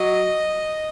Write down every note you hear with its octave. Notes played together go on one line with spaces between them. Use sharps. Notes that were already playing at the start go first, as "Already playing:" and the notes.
Already playing: F#3 D#5